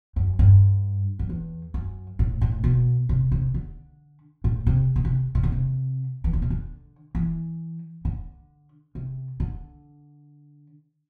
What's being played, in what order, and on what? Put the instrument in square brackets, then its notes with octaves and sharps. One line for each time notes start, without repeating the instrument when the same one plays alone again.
[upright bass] F#2
G2
F#2
E2
F#2
A2
A2
B2
C3
C3
D3
A2
C3
B2
C3
C3
D3
C3
E3
D3
C3
D3
E3
D3
C3
D3